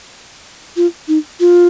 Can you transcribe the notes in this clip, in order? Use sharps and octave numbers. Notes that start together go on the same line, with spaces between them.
F4
D#4
F4